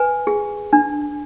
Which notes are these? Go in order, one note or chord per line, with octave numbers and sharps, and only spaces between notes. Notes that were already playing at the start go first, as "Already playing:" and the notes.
Already playing: B4 G#5
G#4
D4